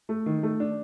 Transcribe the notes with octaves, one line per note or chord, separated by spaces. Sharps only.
A3
D#3
A3
D4